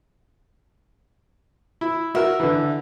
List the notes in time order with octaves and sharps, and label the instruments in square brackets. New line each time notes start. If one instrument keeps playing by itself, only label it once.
[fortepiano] E4
[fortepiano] F#4 A#4 [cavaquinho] E5
[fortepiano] D3 E3